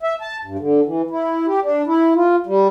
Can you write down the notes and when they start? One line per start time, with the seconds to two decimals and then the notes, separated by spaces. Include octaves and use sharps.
0.03 E5
0.21 A5
0.45 G2
0.59 D3
0.85 E3
1.11 E4
1.46 G4
1.62 D4
1.87 E4
2.15 F4
2.46 G3